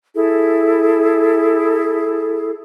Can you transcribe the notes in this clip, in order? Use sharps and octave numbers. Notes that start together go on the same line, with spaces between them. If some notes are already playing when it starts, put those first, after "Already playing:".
E4 G#4 A4